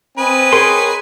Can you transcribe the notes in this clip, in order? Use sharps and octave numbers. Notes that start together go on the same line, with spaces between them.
C4 B4 D#5 G#5
G#4 A#4 C#5 G5 C6